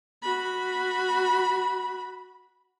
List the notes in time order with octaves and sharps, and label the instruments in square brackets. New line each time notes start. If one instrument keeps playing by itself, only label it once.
[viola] F#4 B5